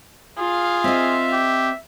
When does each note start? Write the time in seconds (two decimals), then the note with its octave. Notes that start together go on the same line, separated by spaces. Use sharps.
0.38 F4 G#4 F5
0.84 C4 D#5 E5
1.32 G4